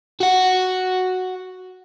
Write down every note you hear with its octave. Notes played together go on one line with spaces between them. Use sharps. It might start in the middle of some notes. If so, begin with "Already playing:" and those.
F#4 F#5